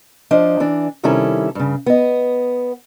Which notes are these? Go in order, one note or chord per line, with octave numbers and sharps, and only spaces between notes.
F3 D4 C5 D#5
E3 D4
C3 D#3 G3 C#4 E4 A4
G2 C#3
B3 D#5